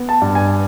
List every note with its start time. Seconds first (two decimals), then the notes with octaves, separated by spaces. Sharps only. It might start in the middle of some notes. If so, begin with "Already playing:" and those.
Already playing: B3
0.09 A5
0.22 G2
0.35 G#5